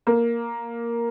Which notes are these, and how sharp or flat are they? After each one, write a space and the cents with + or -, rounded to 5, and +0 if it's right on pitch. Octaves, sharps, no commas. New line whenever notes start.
A#3 +5